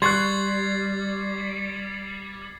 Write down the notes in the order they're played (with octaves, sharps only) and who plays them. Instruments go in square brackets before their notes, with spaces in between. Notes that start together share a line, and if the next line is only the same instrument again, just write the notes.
[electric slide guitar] G3 [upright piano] C6 C#6 F#6 [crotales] G#6 A6 C7